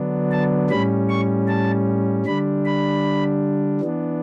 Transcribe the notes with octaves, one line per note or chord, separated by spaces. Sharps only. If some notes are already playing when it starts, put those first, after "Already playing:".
Already playing: D3 F#3 B3 D4
A5
A2 G3 C#4 B5
C#6
A5
D3 G3 D4 B5
B5
E3 B3 D4